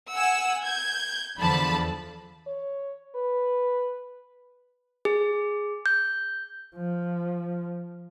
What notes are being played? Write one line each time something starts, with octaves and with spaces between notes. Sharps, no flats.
F#5 G#5 E6
G6 G#6
E2 D3 F3 A5 B5
C#5
B4
G#4
G6
F3